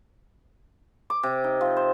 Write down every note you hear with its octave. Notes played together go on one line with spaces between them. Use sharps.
D6
C3
D#4
F3
C5